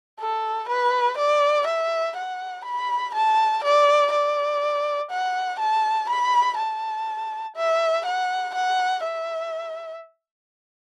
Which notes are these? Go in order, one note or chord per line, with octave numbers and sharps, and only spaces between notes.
A4
B4
D5
E5
F#5
B5
A5
D5
D5
F#5
A5
B5
A5
E5
F#5
F#5
E5